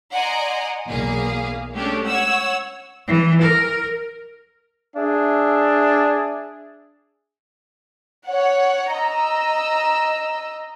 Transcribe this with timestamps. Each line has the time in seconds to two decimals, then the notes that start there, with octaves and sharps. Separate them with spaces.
0.14 D5 D#5 F#5 G#5 A#5 C6
0.89 B1 E2 A#3 G#4 F5
1.75 G#3 A3 C#4 D4 G4 A4
2.07 C#5 F#5 E6
3.07 E3
3.42 A#4
4.97 D4 G#4 E5
8.26 C#5 F#5
8.95 D#5 A#5 E6